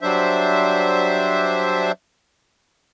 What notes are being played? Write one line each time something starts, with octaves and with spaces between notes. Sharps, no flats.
F#3 G3 D4 C5 E5